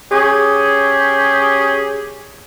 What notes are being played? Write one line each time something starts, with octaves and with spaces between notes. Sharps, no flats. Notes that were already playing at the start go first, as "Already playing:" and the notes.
C#4 G4 G#4